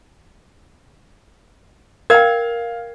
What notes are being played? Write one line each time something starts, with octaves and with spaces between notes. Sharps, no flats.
A#4 F5 G5 G#6